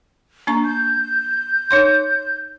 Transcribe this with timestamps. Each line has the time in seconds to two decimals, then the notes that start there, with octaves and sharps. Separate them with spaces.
0.47 A#3 D4 A#5
0.65 G6
1.71 D#4 C#5 C6